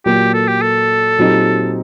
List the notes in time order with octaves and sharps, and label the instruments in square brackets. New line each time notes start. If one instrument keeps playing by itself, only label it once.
[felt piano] A#2 F#3 A#3 [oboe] G4
[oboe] A4
G4
A4
[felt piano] A#2 F#3 C4 D#4 G4